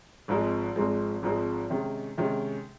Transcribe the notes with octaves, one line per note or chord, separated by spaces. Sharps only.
G#1 G#2 F3 G#3 C4
G#1 G#2 F3 G#3 C4
G#1 G#2 F3 G#3 C4
C3 D#3 G#3 C#4
C3 D#3 G#3 C#4